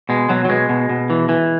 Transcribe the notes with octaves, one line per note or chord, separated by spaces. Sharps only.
B2 G#3
B2 F#3
F#3
B2 G#3
B2
B2
E3
E3